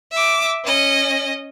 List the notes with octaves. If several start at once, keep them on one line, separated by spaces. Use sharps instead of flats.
E5 D6
C#4 D#5